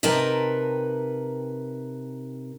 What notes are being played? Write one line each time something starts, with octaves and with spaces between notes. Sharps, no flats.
C3 D#4 A#4 B4 G5 A5